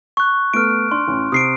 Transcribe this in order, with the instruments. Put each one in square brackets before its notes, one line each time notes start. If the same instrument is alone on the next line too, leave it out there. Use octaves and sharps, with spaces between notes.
[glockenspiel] C#6 F#6
[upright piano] A3 B3 [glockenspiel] F6 D7
[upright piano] D4 [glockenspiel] C6
[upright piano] A1
[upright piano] C3 [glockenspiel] D#6 C7 D7